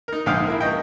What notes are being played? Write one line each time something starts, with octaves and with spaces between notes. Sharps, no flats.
D#4 A#4
A#1 G#2 D3 F5 G5 D#6
A#3 E4
C#2 D#5 G5